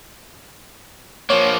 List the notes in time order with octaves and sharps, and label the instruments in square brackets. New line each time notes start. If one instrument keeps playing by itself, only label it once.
[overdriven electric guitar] F3 A#3 [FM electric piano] C#5